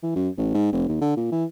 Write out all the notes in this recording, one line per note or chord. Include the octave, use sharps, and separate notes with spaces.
E3
F#2
A1
G#2
F1
D#2
D3
A#2
E3